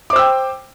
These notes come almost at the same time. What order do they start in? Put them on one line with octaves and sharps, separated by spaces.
D6 C5 E6 G5